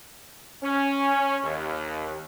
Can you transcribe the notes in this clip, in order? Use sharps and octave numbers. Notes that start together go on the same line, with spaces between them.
C#4
D#2